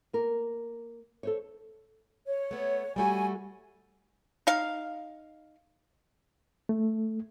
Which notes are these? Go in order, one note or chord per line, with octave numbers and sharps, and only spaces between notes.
A#3 A#4
A4 C5 C#5
C#5
A3 B3
G3 A3 F#4 G#5
D#4 F5
A3